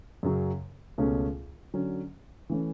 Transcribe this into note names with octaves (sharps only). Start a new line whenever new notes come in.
F#2 C#3 F#3
C#2 B2 A3 C#4
D3 F#3 C#4
E3 A3 C#4